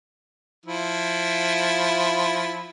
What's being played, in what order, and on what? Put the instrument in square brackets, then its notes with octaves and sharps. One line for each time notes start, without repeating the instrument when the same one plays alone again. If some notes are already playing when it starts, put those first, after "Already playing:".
[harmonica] F3 E4